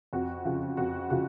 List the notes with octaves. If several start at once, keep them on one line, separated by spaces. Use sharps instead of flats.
F2 F#4
C#3 F3
F2 F#4
C#3 F3 F#4